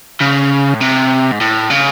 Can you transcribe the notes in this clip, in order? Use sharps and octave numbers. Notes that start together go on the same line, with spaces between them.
C#3
A2
C3
G#2
A2
C#3